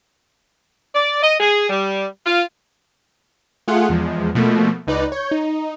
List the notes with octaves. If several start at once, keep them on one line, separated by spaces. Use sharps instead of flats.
D5
D#5
G#4
G3
F4
A3 F4 G#4 F#5
E2 F3 G#3
B2 F3 A3 A#3
C#2 D#4 B4 D5
C#5 G6
D#4